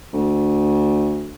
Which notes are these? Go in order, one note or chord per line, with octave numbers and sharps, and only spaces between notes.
D2